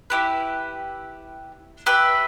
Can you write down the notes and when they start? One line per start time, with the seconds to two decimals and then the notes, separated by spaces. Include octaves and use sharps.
0.10 E4 G4 B4
1.86 G4 B4 E5